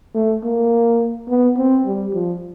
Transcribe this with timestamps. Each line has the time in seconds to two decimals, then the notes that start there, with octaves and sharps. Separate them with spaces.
0.15 A3
0.44 A#3
1.29 B3
1.57 C4
1.86 G3
2.14 F3